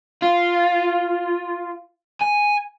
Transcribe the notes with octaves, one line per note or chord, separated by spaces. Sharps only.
F4
G#5